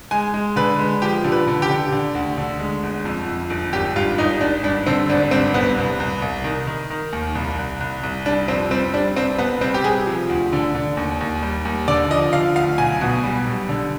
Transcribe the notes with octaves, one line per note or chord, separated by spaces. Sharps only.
G#3 G#5
G#3
D3 B4
G#3
F3 G4
D3
B4
D3
G4
D3
D3
D2
D3
G#3
G1
F2
F2
G1
G#1 G4
G2 F4
G#1 D#4
G#1 D4
G2 D4
D3 C4
G#1 D4
G2 C4
C2 B3
C2
C2
C2
D#3
D#3
D#3
D#2
C2
C2
C2
C2
G3 D4
F2 C4
G3 C4
G3 D4
C2 C4
C2 B3
G3 C4
G4
C3 G#4
F3
D2
D3
D3
D#2
D#2
G3
D#2
D3 D5
F3 D#5
D3 F5
D2 F5
B1 G#5
B2
G3
B1
D3